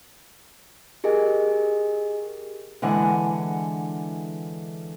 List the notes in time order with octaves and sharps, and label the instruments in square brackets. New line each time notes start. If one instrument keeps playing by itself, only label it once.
[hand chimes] G4 G#4 A#4 D#5 G#5
[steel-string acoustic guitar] D3 E3 G#3 F#5 G#5